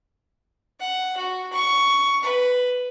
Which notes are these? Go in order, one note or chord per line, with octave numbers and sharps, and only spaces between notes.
F#5
F#4
C#6
B4